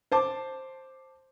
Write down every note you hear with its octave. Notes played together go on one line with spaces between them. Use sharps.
C5 A5 D6